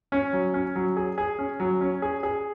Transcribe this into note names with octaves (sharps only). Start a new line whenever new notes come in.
C#4
F#3
C#4
F#3
G#4
G#4
C#4
F#3
C#4
G#4
G#4